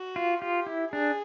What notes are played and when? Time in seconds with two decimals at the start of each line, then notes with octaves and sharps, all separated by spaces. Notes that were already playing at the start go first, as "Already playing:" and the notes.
Already playing: F#4
0.16 F4
0.42 F4 G4
0.66 E4
0.92 D4 G#4